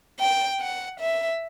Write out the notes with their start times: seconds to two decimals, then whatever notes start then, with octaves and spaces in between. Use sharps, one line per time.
0.20 G5
0.60 F#5
1.00 E5